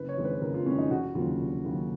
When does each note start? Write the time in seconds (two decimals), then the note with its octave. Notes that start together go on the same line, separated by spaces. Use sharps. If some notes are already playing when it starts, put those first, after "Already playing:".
Already playing: F#1 B4
0.09 C#5
0.16 F2 D#3 G#3
0.25 B4
0.42 F#1 A#4
0.54 F4
0.65 F2 D#3 G#3 C#4
0.78 D#4
0.90 F1 F#4
1.15 D#2 C#3 F#3 F4
1.40 F1
1.64 D#2 C#3 F#3